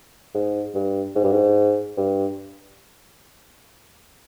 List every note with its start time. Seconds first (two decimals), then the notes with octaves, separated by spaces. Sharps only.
0.35 G#2
0.74 G2
1.16 G#2
1.24 G2
1.32 G#2
1.97 G2